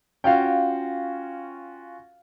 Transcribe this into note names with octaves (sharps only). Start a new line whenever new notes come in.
C#4 F4 F#4 F5 G5